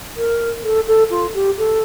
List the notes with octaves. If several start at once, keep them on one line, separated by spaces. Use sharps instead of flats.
A#4
A4
A4
F4
G4
A4